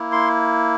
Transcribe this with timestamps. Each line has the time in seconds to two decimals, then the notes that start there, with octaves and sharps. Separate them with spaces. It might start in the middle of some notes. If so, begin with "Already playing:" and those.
Already playing: A#3 E4
0.12 C6